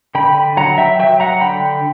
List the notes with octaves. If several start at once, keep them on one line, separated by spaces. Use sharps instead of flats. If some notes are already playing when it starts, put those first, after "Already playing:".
D3 G5 B5
F#3 F#5 A#5
E5 G5
F#3 E5 G5
F#5 A#5
D3 G5 B5